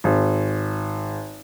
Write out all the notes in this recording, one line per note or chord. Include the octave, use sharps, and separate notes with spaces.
G#1